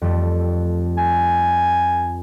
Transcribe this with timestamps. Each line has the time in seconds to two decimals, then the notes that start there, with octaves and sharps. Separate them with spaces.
0.02 F2 G3 A3
0.98 G#5